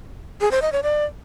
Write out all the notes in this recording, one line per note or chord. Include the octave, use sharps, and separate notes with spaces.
G#4
C5
D#5
C#5
D5